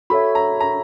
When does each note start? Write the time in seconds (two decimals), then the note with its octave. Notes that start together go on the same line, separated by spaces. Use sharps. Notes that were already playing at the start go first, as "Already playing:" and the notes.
0.10 F#4 A4 C#5 E5 B5
0.35 A#5
0.60 A#5